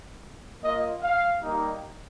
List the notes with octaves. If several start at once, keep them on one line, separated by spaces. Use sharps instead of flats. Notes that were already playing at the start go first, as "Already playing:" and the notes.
A#3 F4 D#5
F5
G3 A#3 D#4 G4